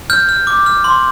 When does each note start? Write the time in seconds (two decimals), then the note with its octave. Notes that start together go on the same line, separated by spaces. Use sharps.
0.10 F6 G6
0.29 F6
0.47 D6
0.66 F6
0.84 C6